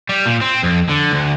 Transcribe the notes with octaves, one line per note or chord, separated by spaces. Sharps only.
G3
A#2
C4
F2
D3
D2